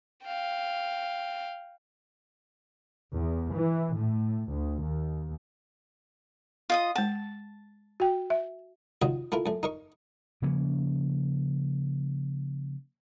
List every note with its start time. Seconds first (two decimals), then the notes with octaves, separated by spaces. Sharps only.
0.24 F5 G5
3.15 E2
3.55 E3
3.95 A2
4.50 D2
4.86 D#2
6.70 F4 D#5 D#6
6.95 G#3 F#5 A5
8.00 F#4 G5
8.30 E5
9.02 D#3 F#3 F4 F#4 D#5
9.32 A3 E4 F4 A#4
9.46 F#2 A3
9.63 D#4 A#4 C#6
10.42 C#3 F3 A#3 C#4